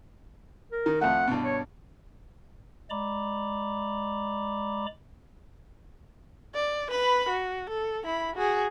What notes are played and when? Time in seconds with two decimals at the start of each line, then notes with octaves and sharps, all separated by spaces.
0.72 A#4
0.86 D#3
1.01 F2 A3 F#5
1.27 G2 B2
1.44 C#5
2.90 G#3 D5 A#5 B5 D6
6.55 D5
6.91 B4 B5
7.29 F#4
7.70 A4
8.05 E4 B5
8.36 F#4 G#4